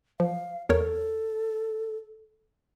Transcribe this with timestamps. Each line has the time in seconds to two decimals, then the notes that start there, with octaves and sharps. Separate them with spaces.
0.20 F3 F5
0.69 E2 A4 A#4 C#5